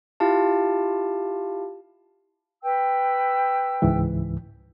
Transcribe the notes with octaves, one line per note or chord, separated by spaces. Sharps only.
E4 F4 G4 F5 A5
B4 G5 E6
C#2 G#2 E3